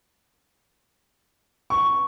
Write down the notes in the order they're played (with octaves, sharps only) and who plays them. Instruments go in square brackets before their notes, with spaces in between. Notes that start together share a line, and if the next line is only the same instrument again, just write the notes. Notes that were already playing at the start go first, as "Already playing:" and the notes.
[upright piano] C#6